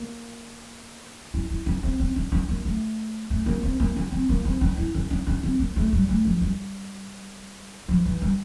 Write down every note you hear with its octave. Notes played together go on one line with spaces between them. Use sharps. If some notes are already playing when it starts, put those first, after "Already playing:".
Already playing: A#3
E4
E4
D4
C4
C4
D4
D4
A#3
A3
A3
A#3
C4
A#3
D4
C4
A#3
C4
D4
E4
D4
D4
D4
C4
A#3
A3
G3
A3
F3
G3
F3
E3
G3